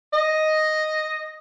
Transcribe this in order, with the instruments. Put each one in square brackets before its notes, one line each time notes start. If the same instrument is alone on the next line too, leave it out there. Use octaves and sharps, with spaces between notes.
[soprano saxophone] D#5